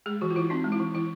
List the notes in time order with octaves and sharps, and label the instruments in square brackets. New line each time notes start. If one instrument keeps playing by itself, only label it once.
[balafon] G#3 G#4
E3 F#4
F4
E3 E4
C4 D#4
G#3
E4
E3
E3 E4